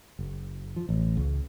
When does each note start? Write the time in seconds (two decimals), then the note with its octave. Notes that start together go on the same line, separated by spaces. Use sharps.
0.19 F#1
0.76 F3
0.89 A1
1.17 C#2